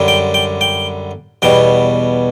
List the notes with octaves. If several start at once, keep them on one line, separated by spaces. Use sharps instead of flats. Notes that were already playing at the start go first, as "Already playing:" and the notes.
Already playing: F#2 D3 G3
G5
G5
G5
E2 B2 G3 G5